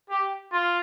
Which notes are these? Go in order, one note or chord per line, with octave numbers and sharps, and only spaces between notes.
G4
F4